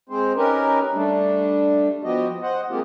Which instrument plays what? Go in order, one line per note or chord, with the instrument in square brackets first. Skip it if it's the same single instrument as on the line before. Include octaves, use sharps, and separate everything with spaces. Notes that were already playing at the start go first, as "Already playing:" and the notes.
[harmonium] G#3 C4 C5
C#4 D#4 G4 A#4 B4
G3 A3 D4
F3 B3 F#4 G4 D#5
C5 D#5 F#5
G#3 A#3 C4 F4 G4